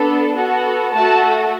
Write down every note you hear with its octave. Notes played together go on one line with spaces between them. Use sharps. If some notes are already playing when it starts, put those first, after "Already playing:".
Already playing: B3 D4 A4
B3 F#4 A4
A3 F#4 A4 A5